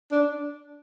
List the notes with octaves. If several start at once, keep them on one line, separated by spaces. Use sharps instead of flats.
D4